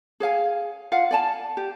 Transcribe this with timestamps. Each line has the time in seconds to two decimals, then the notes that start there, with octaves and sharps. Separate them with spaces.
0.20 G#4 C#5 F5 G#5
0.92 F4 F5 F#5
1.11 D5 G#5 A5
1.57 G4